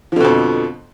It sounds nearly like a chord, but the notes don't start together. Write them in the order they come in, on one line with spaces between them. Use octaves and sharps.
F3 D3 B2 F2